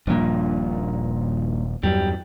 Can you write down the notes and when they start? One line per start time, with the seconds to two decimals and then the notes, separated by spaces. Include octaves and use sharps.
0.07 D#1 G2 A#2 F3 A#3
1.83 E2 G2 F#3 G3